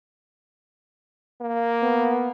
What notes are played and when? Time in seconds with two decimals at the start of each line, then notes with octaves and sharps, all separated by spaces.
1.41 A#3
1.82 B3